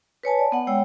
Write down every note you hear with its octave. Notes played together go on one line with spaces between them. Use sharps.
B4 C#5 G#5 A5
D5
B3 F#5
G#3 C#5 G5 E6